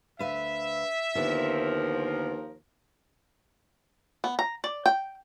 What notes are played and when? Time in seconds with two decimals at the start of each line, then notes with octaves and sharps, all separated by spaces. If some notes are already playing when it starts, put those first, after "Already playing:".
0.19 D2 B4 E5 F5
1.15 D#2 D3 F3 B3 E4 A#4
4.24 B3
4.39 A#5
4.64 D5
4.86 G5